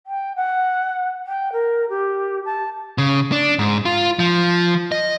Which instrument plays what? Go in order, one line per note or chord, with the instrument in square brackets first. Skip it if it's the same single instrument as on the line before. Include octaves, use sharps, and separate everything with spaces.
[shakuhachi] G5
F#5
G5
A#4
G4
A5
[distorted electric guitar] C#3
D4
G#2
F4
F3
D#5